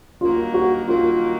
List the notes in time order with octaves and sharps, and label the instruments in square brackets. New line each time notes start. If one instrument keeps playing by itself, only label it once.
[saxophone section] G2 D#3 F#3 A#3 [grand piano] F4
[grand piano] F#4
[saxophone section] G2 D#3 F#3 A#3 [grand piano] F4